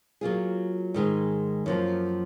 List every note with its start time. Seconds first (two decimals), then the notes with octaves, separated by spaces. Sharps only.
0.21 F#3 A#3 F4 G#4
0.94 G#2 D#3 G#3
1.66 F#2 F3 A#3